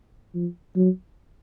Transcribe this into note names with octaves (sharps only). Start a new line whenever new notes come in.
F3
F#3